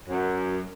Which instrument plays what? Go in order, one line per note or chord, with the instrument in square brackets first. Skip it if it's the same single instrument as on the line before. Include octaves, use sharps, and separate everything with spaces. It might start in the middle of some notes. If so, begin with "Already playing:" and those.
[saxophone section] F#2